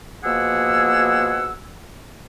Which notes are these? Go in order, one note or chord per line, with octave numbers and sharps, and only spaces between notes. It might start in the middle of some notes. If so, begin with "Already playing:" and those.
B2 F3 A#3 G#4 F#5 E6